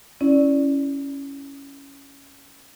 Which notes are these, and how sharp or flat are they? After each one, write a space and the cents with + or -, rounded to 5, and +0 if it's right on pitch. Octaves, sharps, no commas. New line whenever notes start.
C#4 +0 E4 +0 D5 +0